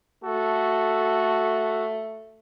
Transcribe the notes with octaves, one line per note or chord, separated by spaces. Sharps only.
A3 F#4 A4